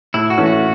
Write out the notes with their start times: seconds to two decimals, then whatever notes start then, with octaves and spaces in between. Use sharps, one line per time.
0.14 A2 E4
0.30 F#4
0.37 E3 A3 C#4
0.46 F#4